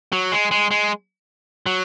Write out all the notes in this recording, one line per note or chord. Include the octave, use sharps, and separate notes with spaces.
F#3
G#3
G#3
G#3
F#3